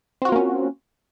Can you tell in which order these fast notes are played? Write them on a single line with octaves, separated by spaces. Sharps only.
C4 F#4 F4 A#3 C#4